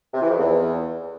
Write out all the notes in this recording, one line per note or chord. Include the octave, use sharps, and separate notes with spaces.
C3
E3
F2
E2